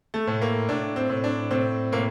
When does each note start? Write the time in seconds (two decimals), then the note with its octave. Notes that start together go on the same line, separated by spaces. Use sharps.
0.14 A3
0.27 A2
0.42 A#3
0.69 A2 D4
0.96 C4
1.10 A2
1.24 D4
1.51 A2 C4
1.92 A2 A#3